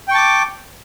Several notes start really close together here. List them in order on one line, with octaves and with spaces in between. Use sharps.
G5 C#6 A5 D6